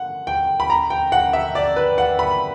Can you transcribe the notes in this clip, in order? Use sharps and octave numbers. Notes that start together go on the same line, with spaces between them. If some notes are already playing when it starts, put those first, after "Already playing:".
Already playing: F#5
G5
B5
A#5
G5
F#5
E5
D5
B4
F#5
B5